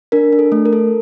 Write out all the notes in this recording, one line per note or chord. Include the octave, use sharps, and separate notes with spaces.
D4 A#4
D4
A4
A3
A#4
A4